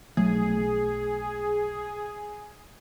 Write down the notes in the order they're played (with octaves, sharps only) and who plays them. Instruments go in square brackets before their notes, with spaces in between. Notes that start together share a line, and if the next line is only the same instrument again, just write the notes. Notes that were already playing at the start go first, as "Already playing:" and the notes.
[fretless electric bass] B1 F#3 A3 [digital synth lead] G#4